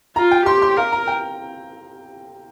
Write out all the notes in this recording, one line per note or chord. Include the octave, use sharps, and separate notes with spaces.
F4 A#5
G5
G4 C6
C6
A#4 F5
A#5
G5